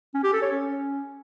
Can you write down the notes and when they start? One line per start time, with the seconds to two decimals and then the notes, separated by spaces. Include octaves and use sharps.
0.14 C#4
0.24 G4
0.33 A4
0.42 C#5
0.52 C#4